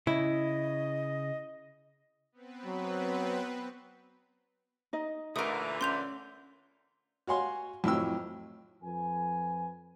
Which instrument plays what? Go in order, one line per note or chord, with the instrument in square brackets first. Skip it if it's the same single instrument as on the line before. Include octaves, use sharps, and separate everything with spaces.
[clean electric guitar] C#3 [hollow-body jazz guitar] E4 [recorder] D#5
[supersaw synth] B3 C4 B4
[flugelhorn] F#3
[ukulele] D#4 D#5
[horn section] A#2 D3 E3 [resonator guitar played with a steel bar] A3 A#4 [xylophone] D#6
[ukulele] C#4 [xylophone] C6 G6 F7
[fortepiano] F#4 C#5 F5 F#5 G#5 C6
F2 A2 F#3 G5 E6
[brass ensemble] F2 F3 B4 G#5